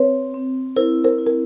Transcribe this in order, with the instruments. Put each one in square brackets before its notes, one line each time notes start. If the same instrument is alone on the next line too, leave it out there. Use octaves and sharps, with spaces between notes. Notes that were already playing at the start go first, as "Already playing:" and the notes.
Already playing: [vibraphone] C4 [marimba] B4 C#5
[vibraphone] C4
[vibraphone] E4 [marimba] A#4 C5
[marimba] A#4 C5
[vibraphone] E4
[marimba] A#4